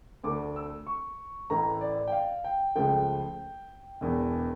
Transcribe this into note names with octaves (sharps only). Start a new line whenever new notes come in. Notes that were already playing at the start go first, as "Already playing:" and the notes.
D2 D3 A3 D6
E6
C#6
A1 A2 E3 A3 A#5
D5
G5
F5
G5
C#2 C#3 F3 A3 G5
E1 E2 E3